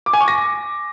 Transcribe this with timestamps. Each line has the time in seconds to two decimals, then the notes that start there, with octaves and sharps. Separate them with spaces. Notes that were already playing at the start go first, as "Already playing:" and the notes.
0.06 D6
0.13 G#5
0.21 C#6
0.28 A#6